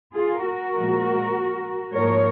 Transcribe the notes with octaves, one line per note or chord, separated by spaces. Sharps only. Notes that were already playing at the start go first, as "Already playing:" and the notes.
F4 G#4
F#4 A#4
A#2 F3 G#3
G#2 F3 A#3 A#4 C#5